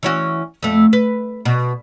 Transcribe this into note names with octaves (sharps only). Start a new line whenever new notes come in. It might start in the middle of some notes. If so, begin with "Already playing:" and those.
E3 C#4 F#4
F2 A3
B4
B2